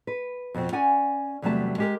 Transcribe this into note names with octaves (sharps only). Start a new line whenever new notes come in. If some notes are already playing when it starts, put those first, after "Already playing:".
B4
F2 B2 C4
C#4 D5 F#5 G#5
E2 C3 F#3 G3 A3 A5
G#3 G4 A#4